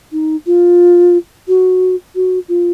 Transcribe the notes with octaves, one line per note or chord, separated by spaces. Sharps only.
D#4
F4
F#4
F#4
F4